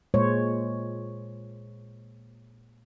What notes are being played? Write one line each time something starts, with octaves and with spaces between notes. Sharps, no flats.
A#2 G#3 C5 C#5